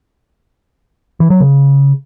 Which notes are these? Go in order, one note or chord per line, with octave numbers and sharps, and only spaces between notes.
E3
F#3
C#3